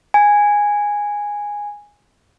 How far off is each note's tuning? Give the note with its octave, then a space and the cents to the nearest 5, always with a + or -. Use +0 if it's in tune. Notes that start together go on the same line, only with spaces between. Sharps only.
G#5 -10